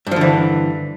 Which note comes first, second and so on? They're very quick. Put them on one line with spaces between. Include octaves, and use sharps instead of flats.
G2 F3 D3 E3